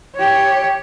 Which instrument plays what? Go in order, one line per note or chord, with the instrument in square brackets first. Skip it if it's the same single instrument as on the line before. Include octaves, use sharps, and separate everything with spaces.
[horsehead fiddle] G4 C#5